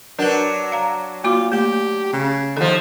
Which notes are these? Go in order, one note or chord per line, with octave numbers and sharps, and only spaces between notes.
F#3 D4 A#4 B4
F5 A#5
A#3 F4 F#4 D6
A3 A#3 G4
C#3
D#2 F3 A4